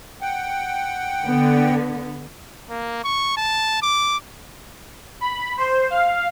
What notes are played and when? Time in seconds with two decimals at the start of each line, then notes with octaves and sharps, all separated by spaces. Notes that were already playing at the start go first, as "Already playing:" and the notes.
0.21 F#5 G5
1.24 D3 B3
2.70 A#3
3.04 C#6
3.37 A5
3.82 D6
5.21 B5
5.58 C5
5.90 F5